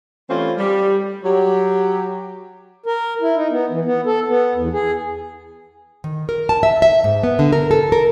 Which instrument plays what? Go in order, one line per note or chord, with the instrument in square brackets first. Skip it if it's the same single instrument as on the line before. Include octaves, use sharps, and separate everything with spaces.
[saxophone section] E3 G3 A3 C4 C#4 F4
G3
F#3 G4
[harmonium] A#4
E4
D#4
B3
E3
B3
A4
B3
E2
G#4
[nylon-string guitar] D#3
A#4
A5
E5
E5
G#2
B3
D3
A#4
A4
A#4